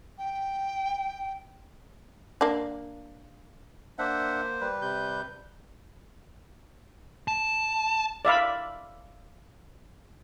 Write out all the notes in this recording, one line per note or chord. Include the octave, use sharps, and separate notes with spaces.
G5
A#3 D4
A#3 D4 C5 E5 F#5
G3 B4
C3 G6
A5
D5 E5 F5 B5